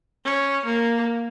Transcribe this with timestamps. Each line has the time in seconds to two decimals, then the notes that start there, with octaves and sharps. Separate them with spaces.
0.25 C#4
0.65 A#3